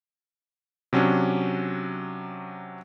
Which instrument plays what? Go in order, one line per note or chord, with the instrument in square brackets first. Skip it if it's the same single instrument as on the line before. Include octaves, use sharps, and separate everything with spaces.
[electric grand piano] C3 F#3 C#4 D4